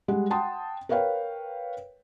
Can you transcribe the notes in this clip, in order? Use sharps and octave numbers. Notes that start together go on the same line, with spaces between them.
G3 G#3 G4 F#5
F#5 G5 A5 C6 D#6
A#4 B4 C#5 F5 G5